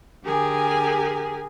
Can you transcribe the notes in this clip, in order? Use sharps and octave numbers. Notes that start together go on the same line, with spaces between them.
D3 G4 G#4 A#4 G#5